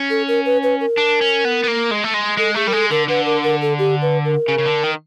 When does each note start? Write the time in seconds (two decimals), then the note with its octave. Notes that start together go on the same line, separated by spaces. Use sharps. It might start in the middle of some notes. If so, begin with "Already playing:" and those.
Already playing: C#4
0.10 A4
0.28 A#4
0.45 B4
0.63 B4
0.80 A#4
0.97 D4
1.21 C#4
1.45 B3
1.64 B3
1.68 A#3
1.91 G#3
2.04 A3
2.14 G#3
2.38 G#3 A4
2.55 A3 G#4
2.67 G3 A#4
2.73 G#3 A4
2.91 D3 A#4
3.08 D3 B4
3.26 A#4
3.43 A#4
3.61 A4
3.79 G4
4.02 B4
4.25 A#4
4.48 C#3
4.59 C#3
4.66 D3
4.84 D#3